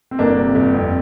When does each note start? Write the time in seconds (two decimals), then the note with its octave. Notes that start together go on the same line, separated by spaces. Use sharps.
0.11 C4
0.19 G1 A#3 D4
0.37 C3
0.55 G1
0.74 F2